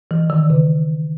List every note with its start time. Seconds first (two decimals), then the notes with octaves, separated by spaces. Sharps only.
0.11 E3
0.30 D#3
0.50 C#3